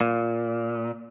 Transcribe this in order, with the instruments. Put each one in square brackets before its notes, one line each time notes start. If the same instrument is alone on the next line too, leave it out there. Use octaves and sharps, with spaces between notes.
[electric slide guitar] A#2